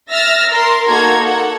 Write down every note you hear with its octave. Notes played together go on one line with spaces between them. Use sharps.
E5 E6 F6 A6 A#6
A#4 C6
A#3 D#4 F#4 A4 A#5 G#6
A4 F#5